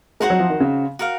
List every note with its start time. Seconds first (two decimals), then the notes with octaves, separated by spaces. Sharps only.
0.20 G#3 D#4 F#4 C5 F#5
0.30 F#3
0.40 F3
0.50 D#3
0.60 C#3
0.99 F#4 A#4 F5